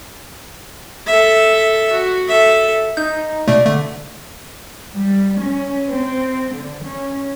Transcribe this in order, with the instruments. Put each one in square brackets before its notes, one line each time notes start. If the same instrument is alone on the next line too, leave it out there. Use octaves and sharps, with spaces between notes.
[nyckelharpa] A4 E5
F#4
A4 E5
[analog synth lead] D#4 [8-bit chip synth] G6
[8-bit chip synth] B2 A3 [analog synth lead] D5
[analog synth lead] D3 [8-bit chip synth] A3
[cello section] G3
C#4
C4
D3
C#4